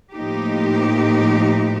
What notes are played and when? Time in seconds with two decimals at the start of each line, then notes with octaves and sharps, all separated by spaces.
0.13 A2 F3 A#3 D#4 G4